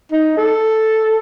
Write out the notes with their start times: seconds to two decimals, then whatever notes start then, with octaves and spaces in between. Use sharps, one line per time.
0.12 D#4
0.37 A4